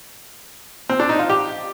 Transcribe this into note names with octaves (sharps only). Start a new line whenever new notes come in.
C4
D4
D#4
F4
G4